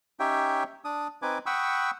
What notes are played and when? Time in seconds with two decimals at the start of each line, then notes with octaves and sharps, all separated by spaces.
0.20 C#4 D#4 G4 C#5 E5 G5
0.85 D4 D#6
1.22 C4 D#4 B4 G#5 D6
1.46 F#5 G5 B5 C#6 D#6 E6